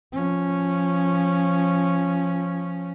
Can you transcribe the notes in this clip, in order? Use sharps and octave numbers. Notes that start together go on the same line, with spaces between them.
F3 C#4